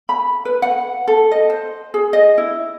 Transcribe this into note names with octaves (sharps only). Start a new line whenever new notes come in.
B5
B4
F#5
A4
D#5
C5
G#4
D#5
E4